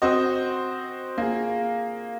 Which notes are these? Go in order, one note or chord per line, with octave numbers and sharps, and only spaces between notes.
C4 F#4 C5 D#5
A#3 F4 G#4